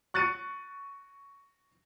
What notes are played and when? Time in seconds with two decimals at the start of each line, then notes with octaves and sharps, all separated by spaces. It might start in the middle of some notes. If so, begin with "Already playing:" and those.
0.14 C#6 F#6 A6 C#7 D#7